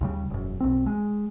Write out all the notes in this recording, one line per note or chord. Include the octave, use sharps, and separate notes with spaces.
D#2 C#3 G3
E1 F#2
B1 C4
G#3